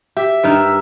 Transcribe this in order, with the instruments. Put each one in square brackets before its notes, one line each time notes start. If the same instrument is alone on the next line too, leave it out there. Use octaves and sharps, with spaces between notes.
[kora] G4 [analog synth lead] E5
[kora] G2 D#3 D#4